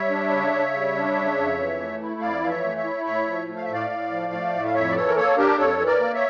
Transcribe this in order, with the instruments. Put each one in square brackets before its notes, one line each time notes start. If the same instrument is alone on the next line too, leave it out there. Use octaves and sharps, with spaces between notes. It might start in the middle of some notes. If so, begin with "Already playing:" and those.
Already playing: [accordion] G3 C#5 E5
D4
C#3
C#3
G3
D4
C#3
F2
E3
A3
E4
F2 D5 F5
E3 F5
C#5 E5
A3
C#5 E5
E4
A2 C#5 E5
F3
A3
F5
E5
A2 D5 F5
A2
F3
A3
A2
F5
F2 C#5 E5
D5
E3 A4 C#5
A#4
A#3 A4 C#5
D4 G4 A#4
F2 A4 C#5
E3
A#4 D5
A#3
C#5 E5